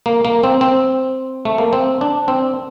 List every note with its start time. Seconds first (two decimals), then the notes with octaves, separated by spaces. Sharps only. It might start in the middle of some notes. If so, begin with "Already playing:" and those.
0.06 A#3
0.25 A#3
0.43 C4
0.61 C4
1.45 A3
1.58 A#3
1.73 C4
2.01 D4
2.28 C4